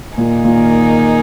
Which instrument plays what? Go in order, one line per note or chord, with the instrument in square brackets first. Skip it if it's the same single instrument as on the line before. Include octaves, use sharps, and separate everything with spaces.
[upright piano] A#2 [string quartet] D#3 A#3 D#4 G#4
[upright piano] A#2